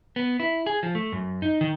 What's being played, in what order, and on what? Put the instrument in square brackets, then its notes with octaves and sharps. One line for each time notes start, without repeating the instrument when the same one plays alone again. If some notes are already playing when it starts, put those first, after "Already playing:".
[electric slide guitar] B3
E4
G#4
F3
A3
F#2
D#4
D#3